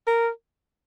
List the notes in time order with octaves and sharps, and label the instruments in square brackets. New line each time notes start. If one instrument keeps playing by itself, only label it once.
[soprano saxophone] A#4